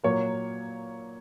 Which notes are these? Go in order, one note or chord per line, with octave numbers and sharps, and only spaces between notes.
A#2 F#3 A#3 C#5